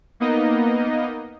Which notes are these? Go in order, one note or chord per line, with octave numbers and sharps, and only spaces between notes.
A#3 B3 D#4 D#5